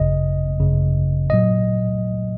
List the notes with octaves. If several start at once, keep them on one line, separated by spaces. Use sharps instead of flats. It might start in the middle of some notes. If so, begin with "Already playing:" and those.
Already playing: G#1 F#2 C#3 D#5
G#1 F#2 C#3
A#2 F#3 D#5